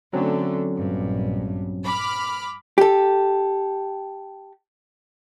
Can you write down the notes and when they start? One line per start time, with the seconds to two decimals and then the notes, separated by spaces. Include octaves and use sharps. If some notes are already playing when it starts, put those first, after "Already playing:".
0.13 D3 F#3 A3 C4 C#4
0.78 A#1 G2
1.84 B5 D6 F6
2.78 G4 A4